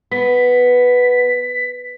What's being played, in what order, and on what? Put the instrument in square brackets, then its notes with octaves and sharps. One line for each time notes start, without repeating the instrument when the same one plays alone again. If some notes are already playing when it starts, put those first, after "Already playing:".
[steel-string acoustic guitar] B3 [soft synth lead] B6